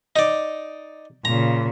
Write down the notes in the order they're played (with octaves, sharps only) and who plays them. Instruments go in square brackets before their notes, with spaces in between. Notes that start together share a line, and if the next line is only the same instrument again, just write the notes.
[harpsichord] D#4 D5
[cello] A#2 C#3 [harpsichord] A#5